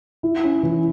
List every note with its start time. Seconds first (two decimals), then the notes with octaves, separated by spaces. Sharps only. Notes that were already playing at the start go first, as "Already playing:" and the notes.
0.23 E4
0.44 C#4
0.63 E3